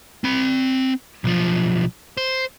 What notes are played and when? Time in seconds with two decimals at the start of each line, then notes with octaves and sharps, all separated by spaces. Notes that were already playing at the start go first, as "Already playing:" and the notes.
0.24 C4 B5
1.24 B1 F3
2.17 C5